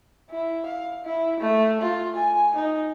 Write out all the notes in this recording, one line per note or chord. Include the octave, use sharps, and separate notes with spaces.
E4
F5
E4
A3
F4
G#5
D#4